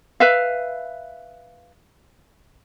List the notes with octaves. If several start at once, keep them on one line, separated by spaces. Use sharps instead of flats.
B4 E5 F5